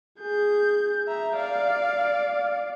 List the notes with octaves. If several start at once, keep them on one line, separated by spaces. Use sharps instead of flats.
G#4 G6
E5 A#5
D5 F5